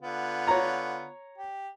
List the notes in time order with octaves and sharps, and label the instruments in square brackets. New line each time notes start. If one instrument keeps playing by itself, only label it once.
[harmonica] D3 B3 F4
[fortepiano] C#5 A#5
[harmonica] G4